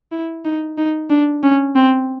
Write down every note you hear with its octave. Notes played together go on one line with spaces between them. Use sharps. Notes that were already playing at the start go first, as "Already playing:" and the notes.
E4
D#4
D#4
D4
C#4
C4